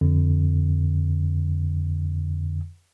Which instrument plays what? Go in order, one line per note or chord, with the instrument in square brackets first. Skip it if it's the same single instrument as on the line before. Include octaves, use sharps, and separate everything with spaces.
[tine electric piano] F2 D3